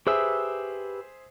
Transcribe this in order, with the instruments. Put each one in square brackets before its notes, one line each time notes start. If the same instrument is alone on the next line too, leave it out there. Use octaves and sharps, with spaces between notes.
[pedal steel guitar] G4 B4 E6 [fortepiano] G#4 C5 E5